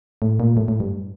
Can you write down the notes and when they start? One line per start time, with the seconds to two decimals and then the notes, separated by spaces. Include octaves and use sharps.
0.22 A2
0.40 A#2
0.57 A2
0.68 A2
0.80 G2